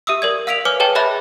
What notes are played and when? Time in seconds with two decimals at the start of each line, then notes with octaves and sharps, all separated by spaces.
0.07 G4 E5 D#6 E6
0.22 A#4 D5 G#6
0.47 F5 E6 B6 D7 F7
0.65 B4 C#5 G#5 D6 F6
0.80 G#4 B4 C#5 D#5 G5 A5
0.95 G#4 C#5 D#5 E5 B5 F#6